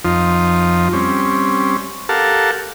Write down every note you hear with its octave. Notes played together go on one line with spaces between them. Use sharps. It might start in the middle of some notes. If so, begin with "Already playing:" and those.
F2 F3 D#4 F4
G3 C4 C#4
G4 A4 A#4 F5 F#5 A5